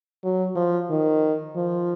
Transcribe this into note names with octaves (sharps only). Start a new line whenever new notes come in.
F#3
F3
D#3
F3